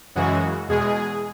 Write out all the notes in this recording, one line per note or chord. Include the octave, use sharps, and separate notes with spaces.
F#2 C#3 E3 G#3 F#4
E2 B2 G#3 G#4